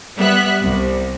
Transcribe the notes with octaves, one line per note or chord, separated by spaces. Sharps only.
G3 B3 E5 F#6
C2